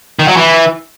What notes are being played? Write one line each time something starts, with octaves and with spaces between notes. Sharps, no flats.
D#3
F#3
E3